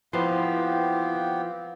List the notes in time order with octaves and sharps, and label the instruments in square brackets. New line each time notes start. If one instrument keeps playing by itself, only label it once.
[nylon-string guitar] F3 [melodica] B3 C4 G4 [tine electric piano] E4 B4 C6 [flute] F5